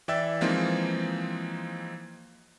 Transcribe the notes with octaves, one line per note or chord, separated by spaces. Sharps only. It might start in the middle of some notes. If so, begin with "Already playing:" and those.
E3 D5 E5 G5 E6 A6
E3 F3 G#3 A#3 C4 D#4